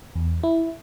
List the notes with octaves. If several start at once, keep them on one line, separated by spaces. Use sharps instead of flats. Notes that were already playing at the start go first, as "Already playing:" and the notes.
E2
E4